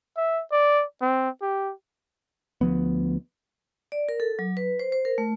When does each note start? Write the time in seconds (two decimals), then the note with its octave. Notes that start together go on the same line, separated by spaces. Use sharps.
0.17 E5
0.52 D5
1.01 C4
1.42 G4
2.61 D2 F3 B3
3.92 D5
4.09 A#4
4.20 A4
4.39 F#3
4.57 B4
4.79 C5
4.92 C5
5.05 A#4
5.18 A3